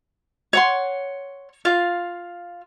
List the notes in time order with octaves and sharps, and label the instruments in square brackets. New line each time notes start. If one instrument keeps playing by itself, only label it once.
[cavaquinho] C#5 F#5 C6
F4 F5